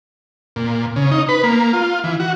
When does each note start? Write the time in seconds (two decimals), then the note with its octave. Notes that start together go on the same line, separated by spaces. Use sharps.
0.56 A#2
0.96 C#3
1.11 D#4
1.29 B4
1.44 A#3
1.73 F4
2.04 E3
2.20 F#4